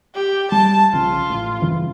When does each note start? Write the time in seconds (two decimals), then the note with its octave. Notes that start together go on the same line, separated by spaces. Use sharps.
0.15 G4
0.52 G3 A5
0.93 A#1 C#3 C#4 F4
1.30 A1
1.62 G2 C#3 E3